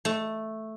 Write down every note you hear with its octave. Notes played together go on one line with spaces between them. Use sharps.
A3